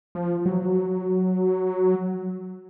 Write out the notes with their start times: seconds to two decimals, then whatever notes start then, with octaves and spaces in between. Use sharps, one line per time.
0.15 F3
0.46 F#3